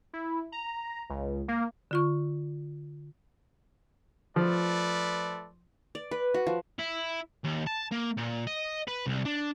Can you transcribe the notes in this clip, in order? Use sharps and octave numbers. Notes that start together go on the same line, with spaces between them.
E4
A#5
C#2
A#3
D3 F4 C#6
F3 A3 B4 D5
D5
B4
F#4
F3
E4
D#2
A5
A#3
A#2
D#5
B4
C2
D4